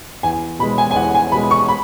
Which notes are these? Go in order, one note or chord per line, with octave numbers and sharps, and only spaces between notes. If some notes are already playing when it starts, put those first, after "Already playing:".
E2 G#5
B2 G#3 B5
G#5
G#5
E2 F#5
G#5
B2 G#3 B5
C#6
B5